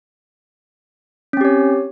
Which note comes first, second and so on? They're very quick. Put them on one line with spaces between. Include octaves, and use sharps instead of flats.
C#4 C4 G4 C#5